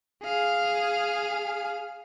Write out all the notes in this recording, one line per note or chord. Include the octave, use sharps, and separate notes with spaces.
G#4 F5